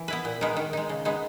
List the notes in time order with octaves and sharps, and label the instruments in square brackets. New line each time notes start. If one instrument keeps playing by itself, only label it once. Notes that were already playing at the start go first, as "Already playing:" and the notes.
Already playing: [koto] E3
B3 E4 B4
A#2
G#3 B3 D#4 A#4
D#3
G#3 D#4
C#3
G#3 B3 D#4